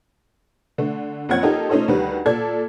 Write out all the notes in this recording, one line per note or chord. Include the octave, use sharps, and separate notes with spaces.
D3 A3
F#1 F3 C4 C#5 F#5 G#6
D#4 F4 G4 A4 A#4
A3 C#4 D#4 F4 A4 C5
D2 D#3 G3 B4
A#2 A4 D5 G#6